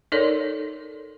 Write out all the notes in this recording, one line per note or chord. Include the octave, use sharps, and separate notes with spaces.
D#4 A4 A#4 C#5 D5